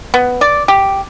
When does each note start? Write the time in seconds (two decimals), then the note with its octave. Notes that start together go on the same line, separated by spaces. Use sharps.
0.14 B3
0.41 D5
0.68 G4